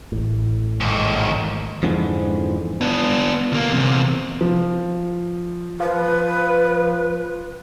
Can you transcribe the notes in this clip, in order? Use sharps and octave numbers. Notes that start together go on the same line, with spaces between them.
A1 A2
D#2 G#2
F2 G#2 D3 E3 F3
B3 D4
D2 A#3
E2 C3
F3
F3 B4